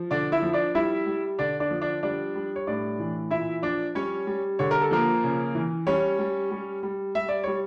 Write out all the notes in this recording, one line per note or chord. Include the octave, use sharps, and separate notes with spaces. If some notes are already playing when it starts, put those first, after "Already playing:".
Already playing: F3
D3 D4 D5
E4 E5
F3
D4 D5
G3 E4 E5
G3
D3 D4 D5
D4 D5
F3
D4 D5
G3 D4 D5
G3
C#5
A2 D4 D5
E3
A#2 E4 E5
F3 D4 D5
G3 C#4 C#5
G3
D3 C#5
A#4
A4
F3 A#3 A#4
C#3
E3
G3 C#4 C#5
G3
G3
G3
G3 E5
D5
G3 C#5